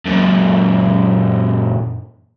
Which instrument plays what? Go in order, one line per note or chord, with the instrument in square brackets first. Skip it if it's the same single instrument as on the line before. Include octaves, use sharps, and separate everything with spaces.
[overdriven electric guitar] F#2 A#2